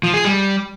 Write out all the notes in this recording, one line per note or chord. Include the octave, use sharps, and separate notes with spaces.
F3
G#4
G3